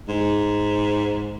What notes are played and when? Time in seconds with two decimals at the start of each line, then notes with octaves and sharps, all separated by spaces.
0.09 G#2